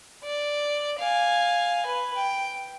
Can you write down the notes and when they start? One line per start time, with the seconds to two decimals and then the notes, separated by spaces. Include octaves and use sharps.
0.24 D5
0.99 F5 G#5
1.86 B4
2.16 G5